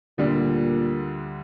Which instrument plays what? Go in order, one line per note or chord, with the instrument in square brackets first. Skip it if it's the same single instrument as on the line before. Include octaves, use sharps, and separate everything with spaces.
[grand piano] D2 D3 G3 D4 [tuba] A#2